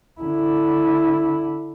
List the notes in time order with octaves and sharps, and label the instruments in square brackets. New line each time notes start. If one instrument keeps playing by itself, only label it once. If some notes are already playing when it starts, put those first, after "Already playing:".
[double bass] D3 E4